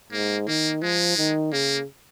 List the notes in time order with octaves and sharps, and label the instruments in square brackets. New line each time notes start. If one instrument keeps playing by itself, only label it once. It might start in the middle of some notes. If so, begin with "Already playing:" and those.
[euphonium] G#2 [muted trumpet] A#3
[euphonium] D#3 [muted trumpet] A#3
[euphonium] F3 [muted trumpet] G#3
[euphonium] D#3
[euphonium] C#3 [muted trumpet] A#3